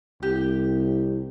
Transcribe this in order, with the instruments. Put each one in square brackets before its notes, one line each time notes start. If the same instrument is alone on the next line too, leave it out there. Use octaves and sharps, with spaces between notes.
[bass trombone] C2 [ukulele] G4